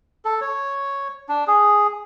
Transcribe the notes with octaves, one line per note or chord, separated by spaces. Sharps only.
A4
C#5
D4
G#4